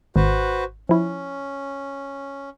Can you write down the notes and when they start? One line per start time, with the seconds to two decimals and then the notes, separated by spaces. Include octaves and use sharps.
0.16 G#1 F#4 B4 C5
0.89 F3 C#4 E4